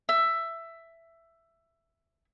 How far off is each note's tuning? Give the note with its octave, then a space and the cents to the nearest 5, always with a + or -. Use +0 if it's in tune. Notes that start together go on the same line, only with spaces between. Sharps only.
E5 +10